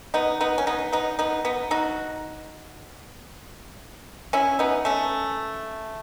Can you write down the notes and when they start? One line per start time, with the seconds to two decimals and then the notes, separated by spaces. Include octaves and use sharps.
0.14 B3 D#4
0.41 B3 D#4
0.58 C#4
0.67 B3 D#4
0.93 B3 D#4
1.19 B3 D#4
1.45 B3 D#4
1.71 D#4 F#4
4.33 C#4 E4
4.59 B3 D#4
4.85 A3 C#4